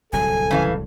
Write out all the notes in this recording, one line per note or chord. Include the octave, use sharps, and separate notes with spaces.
D1 C2 F#3 A4 G#5
C#3 E3 F5